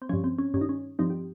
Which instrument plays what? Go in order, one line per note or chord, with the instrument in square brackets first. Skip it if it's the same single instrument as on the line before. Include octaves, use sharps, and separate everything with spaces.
[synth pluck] C4
G2 F3 C#4
C4
C#4
G2 C#4
D#3 D#4
C#4
G2 F3 C4 D#4
G4